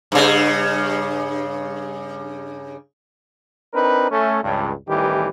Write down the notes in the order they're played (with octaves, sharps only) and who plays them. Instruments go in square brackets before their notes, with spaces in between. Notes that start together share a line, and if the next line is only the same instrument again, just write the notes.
[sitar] G2 C#3
[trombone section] C4 D4 D#4 A#4 B4
A3 C#4
C#2 G2
A1 D#3 E3 G3 G4